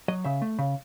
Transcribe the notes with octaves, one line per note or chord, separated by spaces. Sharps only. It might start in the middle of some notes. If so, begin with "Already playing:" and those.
F#3 D#5
C#3 E5
A3
C#3